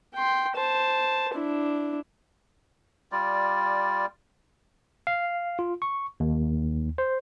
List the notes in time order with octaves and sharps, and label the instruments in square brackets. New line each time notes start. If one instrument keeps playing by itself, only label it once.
[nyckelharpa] G5 C6
C5 A5
D4 E4
[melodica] G3 F4 D5
[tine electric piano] F5
F4
C#6
D#2
C5